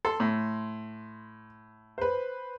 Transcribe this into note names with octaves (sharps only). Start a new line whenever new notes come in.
A4 C6
A2
B4 C5